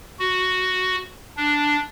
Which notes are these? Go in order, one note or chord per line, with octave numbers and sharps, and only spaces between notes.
F#4
D4